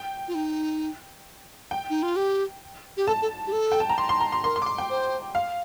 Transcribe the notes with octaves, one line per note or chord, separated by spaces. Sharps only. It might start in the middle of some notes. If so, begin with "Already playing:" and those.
Already playing: G5
F4
D#4
G5
D#4
F4
G4
G4
A4 A5
A4
G4
A4
G5
A5
A#5
C6
C6
A#5
C6
A#4 C6
C6
D6
C6
G5
C5
F5